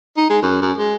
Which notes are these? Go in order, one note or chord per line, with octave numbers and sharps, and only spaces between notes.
D#4
G#3
F#2
F#2
G#3